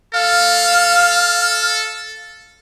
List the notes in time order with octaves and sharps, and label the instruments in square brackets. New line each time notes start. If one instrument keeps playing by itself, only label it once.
[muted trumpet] A4 [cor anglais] F5